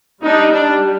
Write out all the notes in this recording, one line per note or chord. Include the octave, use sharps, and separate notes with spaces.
G3 D4 D#4
D4